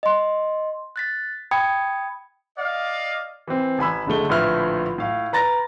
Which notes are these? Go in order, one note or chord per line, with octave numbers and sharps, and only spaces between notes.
D#5 C6
F#6 A6 B6
G5 B5 D#6 G#6 C#7
D5 D#5 F5
E3 C4
A1 G#5 B5 E6
F#1 D3 G#3 A3 G7
A#1 A2 D3 B4 E5 F6
A2 F5
B4 A#5 A6 A#6